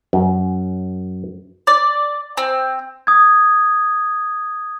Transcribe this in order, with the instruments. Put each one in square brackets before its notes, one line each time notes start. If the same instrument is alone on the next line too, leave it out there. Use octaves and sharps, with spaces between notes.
[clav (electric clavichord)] F#2
[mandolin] D5
C4
[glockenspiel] D#6 G#6